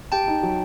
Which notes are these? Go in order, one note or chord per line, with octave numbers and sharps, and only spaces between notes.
G4 G5 A5
D#4
F#3